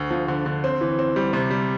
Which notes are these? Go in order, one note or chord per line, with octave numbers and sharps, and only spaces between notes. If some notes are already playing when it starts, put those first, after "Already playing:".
Already playing: D2
F3
D3
D3
C4
E3
C4
G3
C3
G3